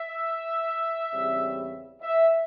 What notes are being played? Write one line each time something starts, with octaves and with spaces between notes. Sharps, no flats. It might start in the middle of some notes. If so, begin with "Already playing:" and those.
Already playing: E5
E2 C#3 G3 C4
E5